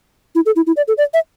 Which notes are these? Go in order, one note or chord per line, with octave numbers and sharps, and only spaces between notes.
E4
A4
E4
E4
D5
A4
D5
E5